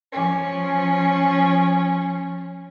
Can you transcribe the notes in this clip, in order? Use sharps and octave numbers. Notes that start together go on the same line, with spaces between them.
F3 C#4